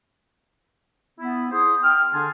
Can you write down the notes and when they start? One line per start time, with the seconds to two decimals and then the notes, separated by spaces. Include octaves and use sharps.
1.19 B3 E4
1.51 E4 G#4 C5 C6 D#6
1.84 G5 F6
2.14 D3 D4 G#4 A5 C6